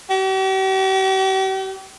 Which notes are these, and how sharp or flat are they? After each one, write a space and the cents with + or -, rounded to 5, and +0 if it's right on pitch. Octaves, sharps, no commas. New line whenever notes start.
G4 -45